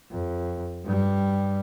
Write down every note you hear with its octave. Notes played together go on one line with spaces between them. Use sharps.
F2
G2 G3